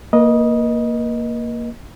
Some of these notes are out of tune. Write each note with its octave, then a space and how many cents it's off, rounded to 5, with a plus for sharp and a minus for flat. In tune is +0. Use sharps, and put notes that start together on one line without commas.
A#3 +0 B4 -40 D#5 +0